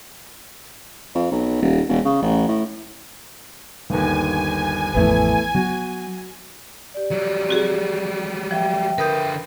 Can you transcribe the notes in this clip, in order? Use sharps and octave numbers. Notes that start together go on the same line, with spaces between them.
F2
B1
D#1
E1
C#3
A1
A2
G1 D#2 G#5
A1 F2 E3 A3 B3
F#3 B3 F#4
G4 D5
F#3 G3
C4 F#4 G#4
F3 E5 G5
D3 A#4 B4 D#6 G6